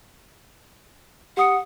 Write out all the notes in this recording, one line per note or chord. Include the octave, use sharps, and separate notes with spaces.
G4 F#5 D#6 C#7